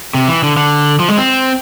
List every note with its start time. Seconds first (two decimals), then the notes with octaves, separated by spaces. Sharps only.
0.14 C3
0.28 E3
0.43 D3
0.57 D3
0.99 F3
1.08 G#3
1.17 C4